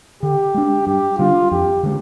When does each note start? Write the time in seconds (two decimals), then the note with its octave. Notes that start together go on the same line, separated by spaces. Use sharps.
0.23 D3 G4
0.54 G#3 D4
0.87 G2 G4
1.19 D3 G3 D4 F4
1.51 F2 G4
1.83 D3 G#3